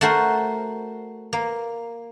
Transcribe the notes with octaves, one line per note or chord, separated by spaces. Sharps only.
A3 F#4 A#4 C5
A#3